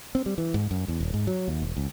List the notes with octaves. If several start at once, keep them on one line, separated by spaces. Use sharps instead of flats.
C4
G3
E3
G#2
F#2
E2
D#1
G#2
F#3
D#2
E1
C#2